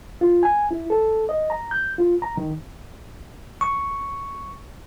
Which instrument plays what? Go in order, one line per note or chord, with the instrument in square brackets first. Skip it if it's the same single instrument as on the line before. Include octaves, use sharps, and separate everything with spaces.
[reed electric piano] F4
G#5
E4
A4
D#5
A#5
G6
F4
A#5
D#3
[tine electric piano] C#6